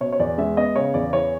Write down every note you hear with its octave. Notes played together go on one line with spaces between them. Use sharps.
B2 C#5
C#5
E2 D5
G#3 E5
B3 D#5
C#3 C#5
E2 D5
E3 C#5